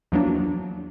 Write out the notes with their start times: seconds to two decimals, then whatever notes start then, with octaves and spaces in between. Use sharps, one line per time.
0.12 E2 F3 F#3 A#3 D4